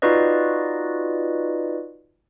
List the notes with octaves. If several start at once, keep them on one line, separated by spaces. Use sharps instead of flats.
D#4 F4 F#4 B4 D5 D#5